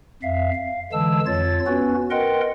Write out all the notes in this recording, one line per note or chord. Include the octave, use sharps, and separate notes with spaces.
F2 E5 F5
F5
D3 E3 G#3 A5 E6
F2 F4 C#5 A6
B3 C#4 F#4 B4
A#4 B4 D#5 F#5 G5 C6